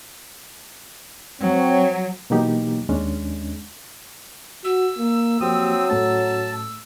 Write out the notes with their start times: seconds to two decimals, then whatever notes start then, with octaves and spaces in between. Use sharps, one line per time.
1.41 F#3 C4 C#5
2.30 B2 E3 F#3 A#3 D#4 G4
2.89 D#2 G#3 C#4 D4
4.65 F#4 E6
4.98 A#3
5.41 F3 F#3 A#3 C4 G4 D#6
5.89 A2 A3 C#4 A5